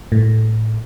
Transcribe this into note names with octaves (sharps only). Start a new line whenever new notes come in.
A2